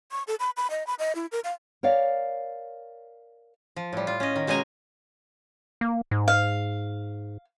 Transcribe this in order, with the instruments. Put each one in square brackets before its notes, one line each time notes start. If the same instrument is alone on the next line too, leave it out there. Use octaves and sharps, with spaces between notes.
[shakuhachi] C#6
A4
B5
B5
D#5
B5
D#5
E4
A#4
F5
[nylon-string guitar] A#4 C#5 D5 F5
[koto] F3
A2 G3
F4
C#4 D#5
D#3
B2 G#3 C#4 D#4 G#5 A#5
[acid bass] A#3
G#2
[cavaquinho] F5